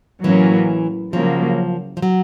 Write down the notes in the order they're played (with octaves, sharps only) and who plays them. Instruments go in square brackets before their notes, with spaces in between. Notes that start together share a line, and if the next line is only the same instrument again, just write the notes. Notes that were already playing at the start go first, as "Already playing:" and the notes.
[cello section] A2 F#3 A#3 C#4 [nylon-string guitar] E3
[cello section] C#3 F#3 A#3 [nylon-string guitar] F3
[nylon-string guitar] F3
F#3